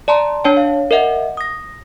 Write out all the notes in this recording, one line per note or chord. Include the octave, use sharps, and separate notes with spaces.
D5 A5 A#5 C6
D4 C#5 G5 A5
F5
A#4 D#5 E5 F#5
D#6 A#6